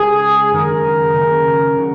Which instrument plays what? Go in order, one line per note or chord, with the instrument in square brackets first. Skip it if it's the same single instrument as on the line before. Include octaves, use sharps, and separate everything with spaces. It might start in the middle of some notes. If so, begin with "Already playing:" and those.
Already playing: [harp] C#3 G#3 D#4 [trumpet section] G#4
[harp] F#2 D#3 F#3 D#4 F#4 [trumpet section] A#4
[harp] C#3 A#3 C#4
C#3 F#3 D#4 F#4